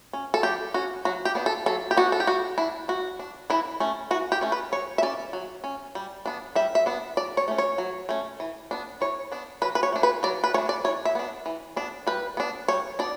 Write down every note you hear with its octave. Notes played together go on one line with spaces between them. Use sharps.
C#4
A4
F#3 G4
C#4 F#4
F#3 F#4
G4
B3 D4
A4
F#3 A4
G4
B3 D4 F#4
A4
G4
G3 F#4
D4 E4
G3 F#4
D4
E3 E4
A3 C#4
E3 F#4
G4
A3 C#4
B4
F#3 C#5
E5
C#4 D5
F#3
C#4
G3
B3 D4
G3 E5
E5
B3 D4
F#3 D5
C#5
A3 C#4
C#5
F#3
A3 C#4
E3
B3 D4
E3 C#5
B3 D4
F#3 B4
B4
C#5
A3 D4
B4
F#3 D5
B4
A3 D4 C#5
D5
E3 C#5
E5
B3 D4
E3
B3 D4
G3 B4
B3 D4
G3 C#5
B3 D4 D5